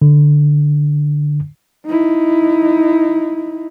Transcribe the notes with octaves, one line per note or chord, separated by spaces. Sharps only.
D3
D#4 E4